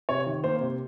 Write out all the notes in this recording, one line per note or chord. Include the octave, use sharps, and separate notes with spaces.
C3 C#5
D#3
A#3 C5
C3